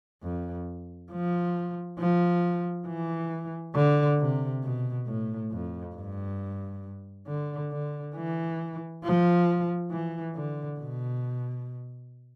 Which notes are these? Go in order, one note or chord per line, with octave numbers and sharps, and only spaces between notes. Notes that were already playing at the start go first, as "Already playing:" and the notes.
F2
F3
F3
E3
D3
C3
B2
A2
F2
G2
D3
D3
E3
F3
E3
D3
B2